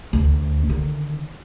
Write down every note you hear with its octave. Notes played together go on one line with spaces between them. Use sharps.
D2
D3 D#3